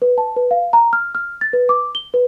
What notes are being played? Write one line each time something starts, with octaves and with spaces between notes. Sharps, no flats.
B4
A5
B4
F5
A#5
F6
F6
A6
B4
D6
G7
B4